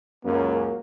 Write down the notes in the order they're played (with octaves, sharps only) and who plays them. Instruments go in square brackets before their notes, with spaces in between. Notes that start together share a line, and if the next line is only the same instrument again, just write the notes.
[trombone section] C#2 F#2 [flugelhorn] A#3